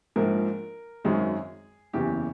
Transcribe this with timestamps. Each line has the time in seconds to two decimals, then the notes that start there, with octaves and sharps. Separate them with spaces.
0.16 A#1 G#2 F3 A#4
1.04 G#1 F#2 D#3 G#3 C4 G#4
1.93 F#1 E2 C#3 E3 G4